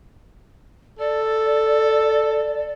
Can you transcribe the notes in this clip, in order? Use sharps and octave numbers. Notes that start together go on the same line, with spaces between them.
A4 D5